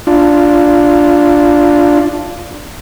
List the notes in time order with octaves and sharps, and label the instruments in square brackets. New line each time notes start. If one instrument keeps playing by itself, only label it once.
[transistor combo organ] D4 F4